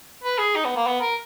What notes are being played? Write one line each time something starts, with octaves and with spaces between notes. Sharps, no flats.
B4
G#4
D#4
B3
A#3
B3
A#4